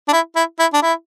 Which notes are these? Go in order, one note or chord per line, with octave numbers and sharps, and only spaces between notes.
D4
E4
E4
E4
D4
E4